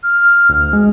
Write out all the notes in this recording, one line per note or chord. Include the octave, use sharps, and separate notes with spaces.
F6
D2
G#3